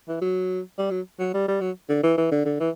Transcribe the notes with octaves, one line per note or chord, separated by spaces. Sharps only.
E3
F#3
G3
F#3
F#3
G3
G3
F#3
D3
E3
E3
D3
D3
E3